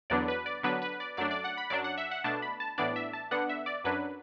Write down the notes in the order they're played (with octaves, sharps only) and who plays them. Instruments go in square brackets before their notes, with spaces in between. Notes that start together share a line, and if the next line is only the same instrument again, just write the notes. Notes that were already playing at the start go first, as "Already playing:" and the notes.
[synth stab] E2 D3 F#3 B3 D4 D5
B4
D5
D3 F#3 B3 D4 B4
B4
D5
F#2 F#3 A3 D4 D5
D5
F#5
B5
F#2 F#3 D4 D5
F#5
E5
F#5
B2 A3 D4 A5
B5
A5
A2 E3 B3 D4 D5
E5
A5
D3 B3 D4 F#5
E5
D5
F#2 F#3 D4 B4